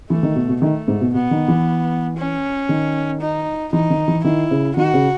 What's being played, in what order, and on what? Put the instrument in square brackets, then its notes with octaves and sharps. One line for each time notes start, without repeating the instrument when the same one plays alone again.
[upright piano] E3 [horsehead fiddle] A3
[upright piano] D#3
B2
B2
[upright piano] D#3 [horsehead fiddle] A3
[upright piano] G#2
B2
[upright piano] B2 [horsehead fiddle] B3
[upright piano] D#3
E3
[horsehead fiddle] C#4
[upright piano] D#3
[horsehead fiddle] D#4
[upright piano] E3 [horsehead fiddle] D#4
[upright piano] D#3
E3
[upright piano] D#3 [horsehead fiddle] E4
[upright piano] C#3
[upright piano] D#3 [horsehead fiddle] F#4
[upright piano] C#3